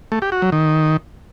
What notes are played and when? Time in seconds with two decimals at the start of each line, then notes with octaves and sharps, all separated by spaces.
0.12 A3
0.22 G4
0.32 F#4
0.42 F#3
0.52 D#3